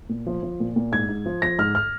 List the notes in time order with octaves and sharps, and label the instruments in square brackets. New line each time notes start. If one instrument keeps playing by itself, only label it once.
[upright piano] A#2
F3
F3
A#2
A#2
G#2 G#6
G#2
F3
F3 A#6
G#2 F6
F6